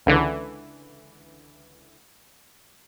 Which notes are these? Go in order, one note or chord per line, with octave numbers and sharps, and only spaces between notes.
C#2 D3 E3